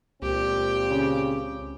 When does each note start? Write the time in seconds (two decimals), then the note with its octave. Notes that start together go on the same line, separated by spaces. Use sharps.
0.22 C#2 A#2 C4 G4
0.90 C#3